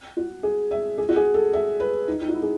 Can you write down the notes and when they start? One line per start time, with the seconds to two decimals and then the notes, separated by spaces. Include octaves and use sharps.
0.17 F#4
0.43 G#4
0.71 E5
0.98 G#4
1.09 F#4
1.16 G#4
1.34 A4
1.53 E5
1.80 B4
2.08 D#4
2.21 D#4
2.28 F#4
2.34 E4
2.42 G#4